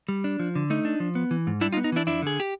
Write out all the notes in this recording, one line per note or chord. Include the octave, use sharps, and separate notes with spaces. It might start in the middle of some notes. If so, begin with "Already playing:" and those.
G3
D4
F3
D3
A3 D#4
D4
F3
B3
E3
G#2
G3 D4 E4
D#4 F4
B3
D#4
E3 D4 E4
F2 D4 E4
D3 G#4
G4